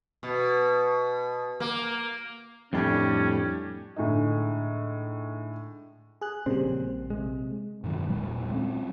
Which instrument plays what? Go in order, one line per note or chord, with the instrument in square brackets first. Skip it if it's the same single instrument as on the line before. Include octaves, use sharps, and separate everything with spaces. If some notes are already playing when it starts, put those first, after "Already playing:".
[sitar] B2
A#3
[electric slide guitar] F2 A2 G3 [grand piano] A3 D4 G4 [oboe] C#4
[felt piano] A2 D3 G#3 D#4
[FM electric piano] G#4 F#6
[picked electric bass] A#2 C4 [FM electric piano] C#3 G3
[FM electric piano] A#1
[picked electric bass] C3 G#3
[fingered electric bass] G2 B2 D#3 F#3
E1 A#2 F#3 G#3
F#3 C4 C#4